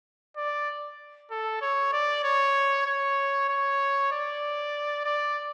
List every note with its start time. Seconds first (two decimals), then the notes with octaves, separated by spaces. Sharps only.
0.37 D5
1.31 A4
1.62 C#5
1.93 D5
2.24 C#5
2.87 C#5
3.49 C#5
4.12 D5
5.05 D5